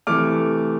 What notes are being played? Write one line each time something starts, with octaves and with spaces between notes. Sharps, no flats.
C3 E3 A3 D6 F6